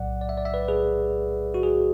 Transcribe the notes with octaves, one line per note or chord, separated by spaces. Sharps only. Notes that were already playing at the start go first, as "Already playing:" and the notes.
Already playing: B1 A2 F#3 D5 F#5
D5
E5
D5
E5
B4 D5
G#4 B4
F#4
G#4